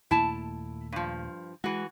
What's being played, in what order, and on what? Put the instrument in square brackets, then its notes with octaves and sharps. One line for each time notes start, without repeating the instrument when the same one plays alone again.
[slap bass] D#2 A#2 A3 [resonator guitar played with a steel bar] E4 A5
[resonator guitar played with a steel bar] G2 F3
[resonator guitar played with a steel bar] E3 F#4 [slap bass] G#3